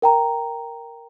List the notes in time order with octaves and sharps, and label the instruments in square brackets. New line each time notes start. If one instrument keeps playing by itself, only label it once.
[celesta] A#4 G5 A#5